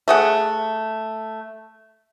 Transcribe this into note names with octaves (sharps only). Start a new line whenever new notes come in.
A3 G#4 F#5